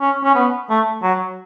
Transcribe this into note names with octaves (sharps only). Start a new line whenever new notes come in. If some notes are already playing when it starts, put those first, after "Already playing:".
C#4
C#4
B3
A3
F#3